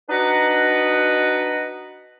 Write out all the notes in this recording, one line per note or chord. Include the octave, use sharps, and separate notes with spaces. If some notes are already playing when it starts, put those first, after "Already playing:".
D4 D#4 F#4 B4 D#5 F#5